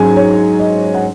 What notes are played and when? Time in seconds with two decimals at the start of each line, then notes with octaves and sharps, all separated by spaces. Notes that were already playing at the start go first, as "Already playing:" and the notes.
Already playing: G#2 F#3 C#4 G#4 G#5
0.16 C#5
0.59 D#5
0.94 F#5